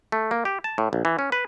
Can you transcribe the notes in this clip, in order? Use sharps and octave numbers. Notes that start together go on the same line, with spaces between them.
A3
A#3
G4
A5
A2
A#1
E3
C#4
B4